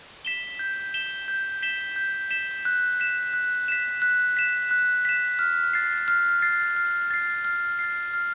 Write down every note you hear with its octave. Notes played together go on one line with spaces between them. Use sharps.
B6 E7 G7
G6
B6 E7 G7
G6
B6 E7 G7
G6
B6 E7 G7
F#6
B6 E7
F#6
B6 E7
F#6
B6 E7
F#6
B6 E7
F6
A6 C7
F6
A6 C7
F6
A6 C7
F6
A6 C7
F6